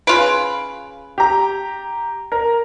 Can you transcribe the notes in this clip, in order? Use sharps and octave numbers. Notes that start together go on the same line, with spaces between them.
C#3 F4 B4 D7
G4 A#5
A#4